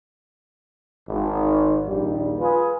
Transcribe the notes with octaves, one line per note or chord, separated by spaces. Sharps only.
G#1
A#1 D#2 G3
F4 G#4 B4